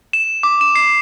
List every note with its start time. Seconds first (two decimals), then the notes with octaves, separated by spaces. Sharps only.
0.13 E7
0.43 D6
0.61 E7
0.75 C7